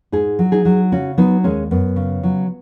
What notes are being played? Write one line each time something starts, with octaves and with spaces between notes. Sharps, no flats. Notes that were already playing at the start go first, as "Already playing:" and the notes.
G#2 D#4 G#4
F#3
D#4 G#4
F#3
C#3 C#4 F#4
F#3 B3 D#4
D#2 G#3 C#4
F#2 B3
C#3
F#3